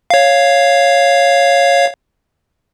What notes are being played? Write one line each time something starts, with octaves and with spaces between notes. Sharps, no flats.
C#5 F5